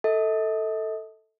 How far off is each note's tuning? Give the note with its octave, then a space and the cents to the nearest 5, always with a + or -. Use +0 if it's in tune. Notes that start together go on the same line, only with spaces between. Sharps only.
A4 +5 D#5 +45